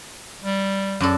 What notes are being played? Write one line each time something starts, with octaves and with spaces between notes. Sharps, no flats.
G3
F#2 D4 A4